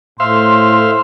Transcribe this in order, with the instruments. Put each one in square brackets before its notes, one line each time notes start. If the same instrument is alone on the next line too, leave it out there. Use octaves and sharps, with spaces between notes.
[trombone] A2 [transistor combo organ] C5 E5 F5 [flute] C6